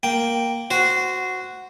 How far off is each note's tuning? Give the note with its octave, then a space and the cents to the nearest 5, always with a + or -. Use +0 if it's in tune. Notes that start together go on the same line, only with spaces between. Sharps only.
A#3 +0 G5 +0
F#4 +0 C5 -15